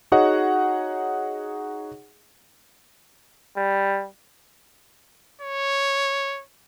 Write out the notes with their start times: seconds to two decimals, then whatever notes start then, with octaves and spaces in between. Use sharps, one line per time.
0.12 D#4 F#4 G#4 C#5 D#5 F#5
3.56 G3
5.41 C#5